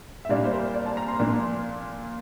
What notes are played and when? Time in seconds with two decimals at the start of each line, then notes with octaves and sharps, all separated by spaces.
0.25 E5
0.29 A#2 G3 A#3 D4 D5
0.45 C5
0.53 A#4
0.74 D5
0.86 A5
0.97 A#5
1.08 C6
1.19 A#2 F3 A#3 D4